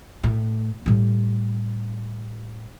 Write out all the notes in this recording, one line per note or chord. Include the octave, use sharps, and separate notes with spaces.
A2
A2 G3